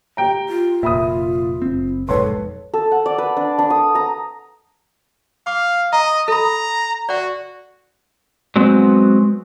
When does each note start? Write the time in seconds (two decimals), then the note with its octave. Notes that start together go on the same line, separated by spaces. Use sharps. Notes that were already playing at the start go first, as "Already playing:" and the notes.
0.17 G4 G5 A#5
0.49 F4
0.83 F1 A#2 E5 B5 D#6
1.62 F#1 C4
2.09 F1 B1 G#2 A4 B4 C#5 C6
2.74 A4
2.92 F#5
3.06 D5
3.18 B4
3.37 D4
3.59 D4
3.70 D#6
3.95 A#5
5.47 F5 D6
5.93 D#5 A#5
6.28 A4 A#5 B5
7.09 F#4 D5 F#5
8.56 F#3 G#3 B3 C4 F#4